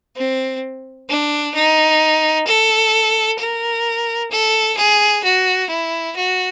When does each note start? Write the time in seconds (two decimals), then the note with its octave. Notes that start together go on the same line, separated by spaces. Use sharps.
0.16 C4
1.09 D4
1.55 D#4
2.47 A4
3.39 A#4
4.32 A4
4.78 G#4
5.24 F#4
5.70 E4
6.16 F#4